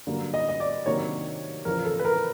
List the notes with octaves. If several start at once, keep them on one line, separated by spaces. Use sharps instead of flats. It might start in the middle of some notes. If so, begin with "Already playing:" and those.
G2 D3 F#3 A#3
D#5
D#5
D5
C3 D#3 F#3 A#3 D4 C#5
E2 C#3 F3 A#4
A4
B4
A#4